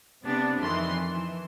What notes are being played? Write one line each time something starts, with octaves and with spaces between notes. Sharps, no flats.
C3 B3 D4
F2 D#3 E3 C6
E3